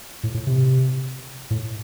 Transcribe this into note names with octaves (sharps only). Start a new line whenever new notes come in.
A2
A2
C3
A2